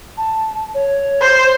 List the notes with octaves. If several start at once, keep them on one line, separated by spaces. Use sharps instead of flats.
A5
C#5
C5